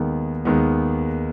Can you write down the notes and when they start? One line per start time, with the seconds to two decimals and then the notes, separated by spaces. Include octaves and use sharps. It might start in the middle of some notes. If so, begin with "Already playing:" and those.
Already playing: D#2 D#3 G#3 B3
0.45 D#2 D#3 G#3 B3